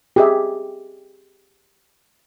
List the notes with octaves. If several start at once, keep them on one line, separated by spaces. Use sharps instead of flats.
G4 G#4 E5